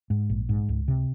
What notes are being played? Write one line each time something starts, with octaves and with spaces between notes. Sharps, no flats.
G#2
A#1
G#2
C#2
C3